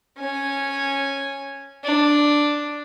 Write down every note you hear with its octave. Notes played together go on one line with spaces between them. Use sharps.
C#4 G#5
D4